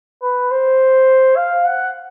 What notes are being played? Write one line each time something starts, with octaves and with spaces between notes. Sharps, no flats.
B4
C5
F5
F#5